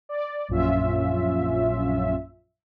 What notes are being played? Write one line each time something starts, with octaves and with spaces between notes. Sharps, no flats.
D5
A#1 F#2 C#4 F4 E5